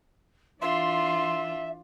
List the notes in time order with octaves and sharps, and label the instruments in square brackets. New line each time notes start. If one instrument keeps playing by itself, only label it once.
[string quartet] E3 D4 F4 [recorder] E5 [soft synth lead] C6